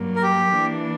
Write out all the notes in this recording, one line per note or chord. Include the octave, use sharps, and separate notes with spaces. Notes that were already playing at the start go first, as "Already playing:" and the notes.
Already playing: G2 F#3 A#3
A#4
G4
E3 A#3 D4